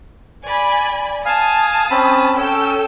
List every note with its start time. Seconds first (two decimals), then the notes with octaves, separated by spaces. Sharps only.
0.46 D5 G#5 B5
1.26 F5 G#5 A5 D#6
1.91 C4 C#4 B5
2.37 C#4 A4 G5 E6